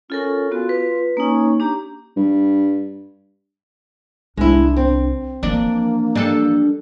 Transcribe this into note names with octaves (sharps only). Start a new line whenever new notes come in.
C#4 F4 A4 A#4
B3 F4 F#4
B4
A#3 C#4 D#4
D4 G4 A#5
G2
C2 G#3 D4 E4
C4
E3 F3 A#3 D4
G3 D4 A4